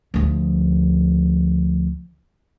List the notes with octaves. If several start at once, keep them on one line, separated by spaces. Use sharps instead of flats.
D2 F3